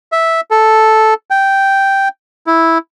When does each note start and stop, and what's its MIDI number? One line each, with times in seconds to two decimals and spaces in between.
0.12 0.41 76
0.51 1.14 69
1.30 2.08 79
2.47 2.78 64